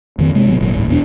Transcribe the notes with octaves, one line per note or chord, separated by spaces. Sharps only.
F2 D#3 C4
C3 G#3 A#3
G#1 B2 F#3
G1 A#2 F#3
D1 A1 G#2
E2 B2 D4